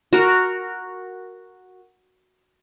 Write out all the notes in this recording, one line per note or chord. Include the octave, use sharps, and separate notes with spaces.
F#4 A#4